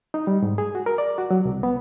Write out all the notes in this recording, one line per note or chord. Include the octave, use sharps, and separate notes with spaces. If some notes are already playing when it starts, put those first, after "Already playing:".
D#4
G3
G#2
G#4
F#4
A#4
D5
F#4
F#3
C2
B3